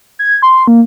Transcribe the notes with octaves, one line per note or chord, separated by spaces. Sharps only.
G#6
C6
A#3